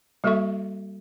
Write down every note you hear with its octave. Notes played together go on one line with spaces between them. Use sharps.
G3 A#3 F#4 A4 E5 C#6